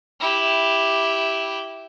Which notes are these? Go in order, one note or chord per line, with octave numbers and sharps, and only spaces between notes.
E4 G4